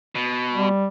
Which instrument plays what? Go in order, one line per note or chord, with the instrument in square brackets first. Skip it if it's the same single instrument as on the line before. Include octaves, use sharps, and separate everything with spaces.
[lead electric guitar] B2
[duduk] G3